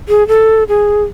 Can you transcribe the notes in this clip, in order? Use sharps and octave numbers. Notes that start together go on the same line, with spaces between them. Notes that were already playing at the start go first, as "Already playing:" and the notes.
G#4
A4
G#4